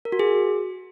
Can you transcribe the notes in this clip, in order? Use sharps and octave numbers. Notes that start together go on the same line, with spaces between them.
A#4
F#4
G#4